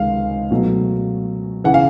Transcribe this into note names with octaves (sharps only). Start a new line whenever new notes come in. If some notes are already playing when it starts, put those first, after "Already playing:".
Already playing: C#2 C3 D#3 G#3 F5
B2 F#3 A3
C#3 E3 F#5
F5